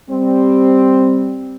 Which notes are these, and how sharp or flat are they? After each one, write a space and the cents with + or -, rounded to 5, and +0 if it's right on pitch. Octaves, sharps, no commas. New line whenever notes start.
G3 +0 C4 +0